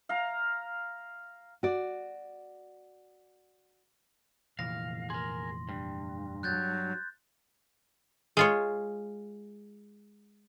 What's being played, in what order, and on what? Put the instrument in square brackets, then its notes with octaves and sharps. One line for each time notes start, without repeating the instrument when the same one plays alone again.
[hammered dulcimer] F5 A#5
[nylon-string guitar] F#4 D5
[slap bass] F1 A#2 E3 [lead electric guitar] F5 [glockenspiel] A#6
[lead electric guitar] G#4 A#4 [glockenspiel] C6
[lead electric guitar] G2
[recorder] F#3 [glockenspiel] F#6 G6 A6
[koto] G#3 F4 C#5